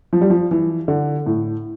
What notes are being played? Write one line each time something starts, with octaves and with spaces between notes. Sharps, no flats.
F3
G3
F3
E3
D3
A2